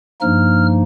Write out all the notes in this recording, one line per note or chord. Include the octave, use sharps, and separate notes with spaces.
G2 F3 A#3 D#4 F6